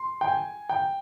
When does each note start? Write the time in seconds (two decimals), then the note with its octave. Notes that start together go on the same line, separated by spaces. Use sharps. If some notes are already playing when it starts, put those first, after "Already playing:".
Already playing: C6
0.21 G5
0.28 G#5
0.69 G5